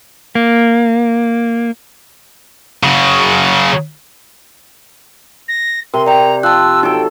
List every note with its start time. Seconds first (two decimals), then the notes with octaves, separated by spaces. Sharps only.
0.35 A#3
2.83 C#3 F#3
5.48 A#6
5.94 C3 A#4 C6
6.06 D5 G5 A#5
6.43 F3 A5 E6 F#6
6.83 F#3 D#4 A4 G5